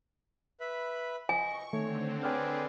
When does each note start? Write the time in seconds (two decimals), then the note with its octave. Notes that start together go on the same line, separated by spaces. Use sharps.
0.60 B4 E5 B5
1.29 D#5 G#5 C#6
1.73 D3 D#3 A3 C4 C#5
2.23 G#4 B4 C#5 D5 G5 F6